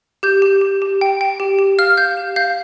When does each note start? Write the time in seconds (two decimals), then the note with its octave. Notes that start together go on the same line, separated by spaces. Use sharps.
0.23 G4 G6
0.42 G4
0.61 G4
0.82 G4
1.01 G5
1.21 G5
1.40 G4
1.59 G4
1.79 F5 F6
1.97 F5 G6
2.17 G4
2.36 F5 G6